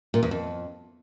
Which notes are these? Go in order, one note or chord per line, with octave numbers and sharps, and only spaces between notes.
A#2
E2
F2